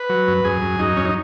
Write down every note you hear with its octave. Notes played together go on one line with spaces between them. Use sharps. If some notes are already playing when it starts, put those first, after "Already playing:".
Already playing: B4
F#3
F#2
F#2 G#4
F#2
F#2 D#4
F#2 C#4
D#4